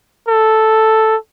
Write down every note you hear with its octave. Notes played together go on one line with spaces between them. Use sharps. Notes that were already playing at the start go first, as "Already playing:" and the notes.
A4